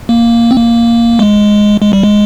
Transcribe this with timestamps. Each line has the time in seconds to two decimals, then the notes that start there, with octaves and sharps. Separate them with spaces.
0.09 A#3
0.51 C4
0.57 A#3
1.19 G#3
1.81 G#3
1.93 G3
2.03 G#3